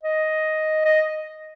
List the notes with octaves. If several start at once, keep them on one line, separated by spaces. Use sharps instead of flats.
D#5
D#5